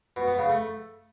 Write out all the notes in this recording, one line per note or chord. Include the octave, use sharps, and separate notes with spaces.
B2
B3
C#3
A3